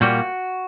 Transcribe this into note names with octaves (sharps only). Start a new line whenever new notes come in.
A#2 G3 A#3 F#4